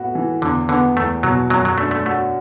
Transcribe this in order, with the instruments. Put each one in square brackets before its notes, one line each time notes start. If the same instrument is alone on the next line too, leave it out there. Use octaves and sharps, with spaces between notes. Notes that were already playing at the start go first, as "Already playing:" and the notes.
Already playing: [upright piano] A2 B3 F#4
E3
[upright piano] E2 [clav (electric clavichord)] D3
[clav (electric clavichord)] D3 [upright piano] B3
[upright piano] E2 [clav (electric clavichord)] A3
[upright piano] B2 [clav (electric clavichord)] F#3
[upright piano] F#2 [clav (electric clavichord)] F#3
[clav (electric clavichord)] F#3
[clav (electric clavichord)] A3 [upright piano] D4
[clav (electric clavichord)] A3
[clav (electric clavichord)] A3 [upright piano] F#4